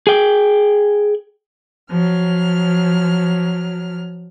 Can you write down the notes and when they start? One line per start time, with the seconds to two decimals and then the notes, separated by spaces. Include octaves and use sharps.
0.07 G#4 G5
1.90 F3 F#3 F6